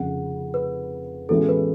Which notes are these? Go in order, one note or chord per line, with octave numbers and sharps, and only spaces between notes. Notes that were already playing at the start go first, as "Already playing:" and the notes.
Already playing: F1 F2 C#3 F#5
B4
A1 A2 G#3 B3 F#4 A4
B4